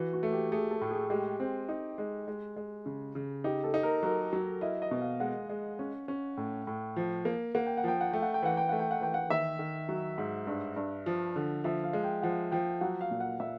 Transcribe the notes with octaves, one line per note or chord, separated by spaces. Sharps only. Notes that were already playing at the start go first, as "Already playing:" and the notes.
Already playing: E3 F#4
F#4
A3
G4
A3 G#4
A4
A2
G#4
G#3 G4
C4
D#4
G#3
G#3
G#3
C#3
C#3
D#4 G4
A4
D#4
A#4
F#3 A#4
F#3
E4 D#5
D#5
B2
F5
G#3 F#5
G#3
C#4
C#4
A2
A2
F3
A#3
A#3 F#5
G5
F#5
F3 G5
F#5
A3 G5
F#5
G5
E3 F#5
G5
A3 F#5
G5
F#5
E3 G5
F#5
D#3 E5
D#3
F#3
G#2
G2
G2
F3
D3
F3 E5
F5
G#3
G5
F3 F#5
F3 G5
F#3 F#5
F5
A#2
F#5
A#2 E5